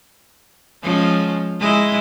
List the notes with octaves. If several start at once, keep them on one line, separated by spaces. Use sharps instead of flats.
F3 G#3 C#4
G#3 E4 D#5